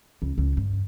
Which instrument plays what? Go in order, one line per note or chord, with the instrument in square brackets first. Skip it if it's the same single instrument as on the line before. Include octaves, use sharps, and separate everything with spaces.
[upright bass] C#2
C#2
G2